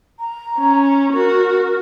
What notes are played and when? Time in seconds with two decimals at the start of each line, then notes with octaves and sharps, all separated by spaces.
0.19 A#5
0.58 C#4
1.13 F#4 A#4